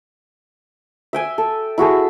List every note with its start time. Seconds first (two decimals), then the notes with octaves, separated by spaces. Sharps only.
1.13 E5 G5 G#5
1.38 A4
1.78 E4 F#4 G#4 A4